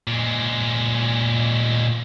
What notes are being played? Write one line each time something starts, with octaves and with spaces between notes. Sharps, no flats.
A#2 G#3